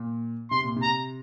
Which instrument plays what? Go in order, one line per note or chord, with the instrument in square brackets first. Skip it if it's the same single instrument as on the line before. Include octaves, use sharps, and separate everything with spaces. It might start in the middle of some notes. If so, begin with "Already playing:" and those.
Already playing: [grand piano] A#2
[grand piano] C3 [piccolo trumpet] C6
[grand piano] A#2
C3
[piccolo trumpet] A#5